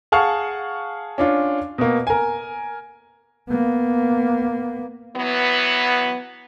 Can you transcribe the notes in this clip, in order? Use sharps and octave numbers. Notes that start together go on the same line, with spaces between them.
G#4 F5 F#5 A5 C#6 F6
C#4 D4 F4
B2 A#3
A#4 G#5
A#3 B3
E3 F#3 B3